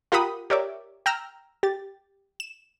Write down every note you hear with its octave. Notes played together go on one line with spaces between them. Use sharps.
F4 G4 A#4 F#5 B5 D#6
G4 A#4 C#5 D5 E5 D6
G5 A#5 E6 F6
G4 A6
E7